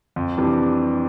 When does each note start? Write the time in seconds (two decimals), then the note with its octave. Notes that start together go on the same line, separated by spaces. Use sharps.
0.16 F2
0.38 C3 E3 G3 D4